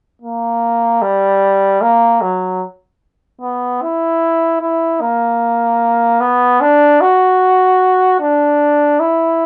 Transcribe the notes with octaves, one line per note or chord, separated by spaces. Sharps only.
A#3
G3
A#3
F#3
B3
E4
E4
A#3
B3
D4
F#4
D4
E4